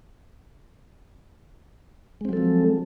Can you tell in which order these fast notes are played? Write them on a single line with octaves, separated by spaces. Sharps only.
G#3 C4 F#3 A4 F3